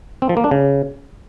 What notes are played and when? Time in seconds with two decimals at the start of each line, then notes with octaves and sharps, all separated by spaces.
0.22 C4
0.29 F3
0.37 A#3
0.44 D4
0.51 C#3